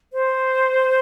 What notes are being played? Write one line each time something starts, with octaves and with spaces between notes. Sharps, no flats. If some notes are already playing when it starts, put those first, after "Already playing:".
C5